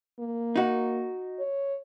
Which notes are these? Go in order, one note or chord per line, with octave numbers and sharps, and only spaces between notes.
A#3
D#4 F#4
C#5